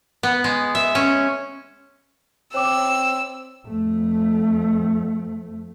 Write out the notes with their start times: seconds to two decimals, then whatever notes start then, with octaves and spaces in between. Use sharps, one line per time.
0.23 B3
0.44 G#3
0.75 E5
0.95 C#4
2.54 C4 C#5 G5 D6 E6
3.67 F2 A3